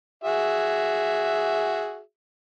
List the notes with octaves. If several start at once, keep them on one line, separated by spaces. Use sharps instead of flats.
F#4 G#4 E5